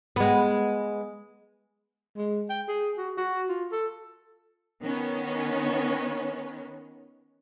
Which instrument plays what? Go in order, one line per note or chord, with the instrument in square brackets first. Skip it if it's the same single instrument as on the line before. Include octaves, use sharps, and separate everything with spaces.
[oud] G#3 B3
[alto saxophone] G#3
G5
G#4
F#4
F#4
F4
A4
[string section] D#3 B3 C#4